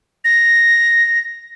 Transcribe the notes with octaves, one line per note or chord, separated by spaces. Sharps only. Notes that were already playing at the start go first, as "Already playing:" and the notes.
A#6